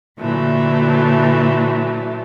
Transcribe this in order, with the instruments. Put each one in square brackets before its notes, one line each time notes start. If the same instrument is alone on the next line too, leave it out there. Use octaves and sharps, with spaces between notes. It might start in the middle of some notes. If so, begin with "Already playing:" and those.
[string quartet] A#2 D3 E3 F#3 A3